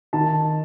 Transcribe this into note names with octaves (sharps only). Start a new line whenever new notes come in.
D#3 A5